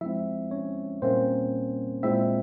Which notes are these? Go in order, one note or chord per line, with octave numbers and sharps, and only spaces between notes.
F3 G#3 C4 E4 E5
C#4 C#5
A#2 G3 A#3 C4 C#4 C5
A#2 G#3 C4 E4 E5